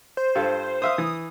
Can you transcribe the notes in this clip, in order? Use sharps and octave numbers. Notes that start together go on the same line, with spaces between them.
C5
G2 F4 A4
C5 E5 F5 D#6
E3